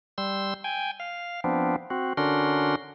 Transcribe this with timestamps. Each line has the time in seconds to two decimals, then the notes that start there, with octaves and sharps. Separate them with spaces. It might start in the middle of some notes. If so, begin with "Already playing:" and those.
0.18 G3 C6 E6
0.64 G5 G#5
1.00 F5
1.44 F3 B3 C4 D4
1.90 C4 F#4
2.17 D3 C#4 D4 F#4 A#4 C6